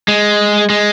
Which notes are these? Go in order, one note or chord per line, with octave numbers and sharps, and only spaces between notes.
G#3
G#3